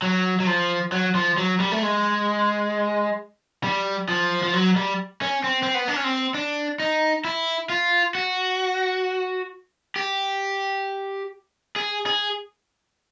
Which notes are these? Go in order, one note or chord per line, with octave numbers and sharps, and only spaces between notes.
F#3
F#3
F3
F#3
F3
F#3
G3
A3
G#3
G3
F3
F3
F#3
G3
C#4
C4
C4
B3
D4
C#4
C4
D4
D#4
E4
F4
F#4
G4
G#4
G#4